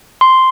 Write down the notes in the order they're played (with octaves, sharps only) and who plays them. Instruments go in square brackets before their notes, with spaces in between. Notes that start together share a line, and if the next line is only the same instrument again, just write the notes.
[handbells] C6